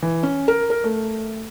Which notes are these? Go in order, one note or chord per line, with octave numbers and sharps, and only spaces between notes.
E3
C#4
A#4
A#4
A3